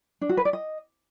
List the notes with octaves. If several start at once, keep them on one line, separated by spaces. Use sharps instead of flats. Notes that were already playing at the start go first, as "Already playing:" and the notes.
D4
F#4
B4
D5
D#5